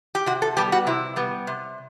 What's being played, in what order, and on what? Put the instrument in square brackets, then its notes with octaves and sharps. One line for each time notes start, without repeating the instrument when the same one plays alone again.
[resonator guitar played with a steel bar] G4
C3 F#4
A4
G3 B3 G4
F#4
C3 E4
G3 B3
C3